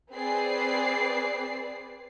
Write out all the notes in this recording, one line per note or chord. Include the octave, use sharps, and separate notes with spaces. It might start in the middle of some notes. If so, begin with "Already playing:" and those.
C4 G#4 B4 D5 C7